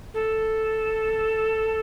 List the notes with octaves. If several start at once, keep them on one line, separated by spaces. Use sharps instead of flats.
A4